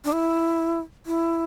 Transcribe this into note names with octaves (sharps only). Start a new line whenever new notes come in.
D4
E4
E4